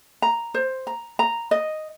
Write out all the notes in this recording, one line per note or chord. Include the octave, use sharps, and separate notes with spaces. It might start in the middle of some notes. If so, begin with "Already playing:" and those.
A#5
C5
A#5
A#5
D#5